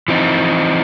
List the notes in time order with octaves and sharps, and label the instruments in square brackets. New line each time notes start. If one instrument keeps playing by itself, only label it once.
[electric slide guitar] E3 F3 C4 D#4